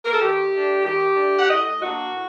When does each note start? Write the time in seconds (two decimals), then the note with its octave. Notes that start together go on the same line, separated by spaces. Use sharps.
0.04 A#4
0.13 A4
0.20 D#3 G4
0.53 A3 D4
0.84 D#3 G4
1.16 A3 D4
1.39 F#5
1.48 A2 D#5
1.80 F#3 A#3 D4 F#4
2.13 A2